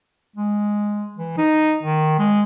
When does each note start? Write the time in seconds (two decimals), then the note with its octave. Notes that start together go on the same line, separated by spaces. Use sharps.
0.36 G#3
1.17 E3
1.38 D#4
1.83 D#3
2.19 G#3